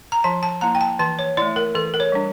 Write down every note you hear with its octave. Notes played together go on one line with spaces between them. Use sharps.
A#5
F3 A5
A5
A#3 E4 A#5
G5
A5
E3 A5
C#5
A3 E4 D5
A#4
E3 A4
A#4
C#5
G3 D4